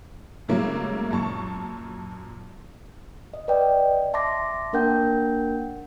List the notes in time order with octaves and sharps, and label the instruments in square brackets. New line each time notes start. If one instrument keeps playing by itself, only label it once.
[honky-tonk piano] G#2 C#3 F#3 G3 A3 A#3
F#2 A#2 A5 C#6
[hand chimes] D#5
B4 D5 D#5 G5
E5 A5 C6 D6 A#6
A#3 D4 A#4 F#5 G5 G6